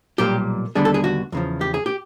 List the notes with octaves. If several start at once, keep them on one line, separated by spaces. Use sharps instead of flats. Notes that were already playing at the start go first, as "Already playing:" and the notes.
B1 A#2 G3 A#3 G4
D#2 D3 G3 B3 D4 G#4
A4
G#4
F#4
E2 C#3 F3
G4
G#4
G4